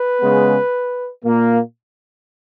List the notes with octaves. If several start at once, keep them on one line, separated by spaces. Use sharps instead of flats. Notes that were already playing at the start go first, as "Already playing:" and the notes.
Already playing: B4
C#3 G#3 B3
A#2 A#3